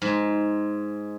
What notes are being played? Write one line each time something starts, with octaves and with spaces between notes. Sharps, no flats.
G#2